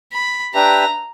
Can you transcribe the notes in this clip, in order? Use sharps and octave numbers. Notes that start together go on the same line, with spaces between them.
B5
D4 G4 B4 E5 A#5